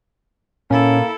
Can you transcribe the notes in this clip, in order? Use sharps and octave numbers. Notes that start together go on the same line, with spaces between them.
A#2 A#3 C#4 E4 A4